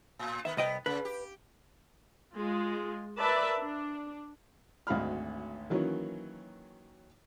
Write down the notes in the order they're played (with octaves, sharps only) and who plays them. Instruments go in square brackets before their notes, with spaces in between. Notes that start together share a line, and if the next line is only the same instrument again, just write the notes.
[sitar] A2
[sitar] D#3 B3 [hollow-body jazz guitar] E5
[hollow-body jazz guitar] C2 D#5 G5 [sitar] B3
[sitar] C#3 [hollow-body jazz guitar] B4
[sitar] G4
[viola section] G#3 F4
A#4 B4 D5 E5 A5
D4
[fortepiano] G#1 D2 F#4 F5 B5 F6
D#3 E3 F#3 A#3 C#4